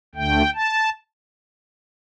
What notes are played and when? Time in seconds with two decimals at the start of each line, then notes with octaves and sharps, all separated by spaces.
0.15 D2 D3 A3 G5
0.54 A5